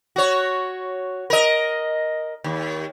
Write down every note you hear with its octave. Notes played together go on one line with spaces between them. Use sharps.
F#4 C#5
A#4 D#5
D#2